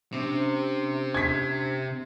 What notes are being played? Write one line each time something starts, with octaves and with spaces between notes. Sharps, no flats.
C3 C#4 D4 C5
G#6 B6